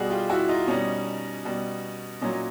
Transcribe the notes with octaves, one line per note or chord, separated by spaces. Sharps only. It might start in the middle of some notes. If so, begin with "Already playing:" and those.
Already playing: B2 G3 F#4 G#4
F4 G4
E4 F#4
D#4 F4
B2 G3 C#4 D#4
B2 G3
A#2 F#3 C#4 D#4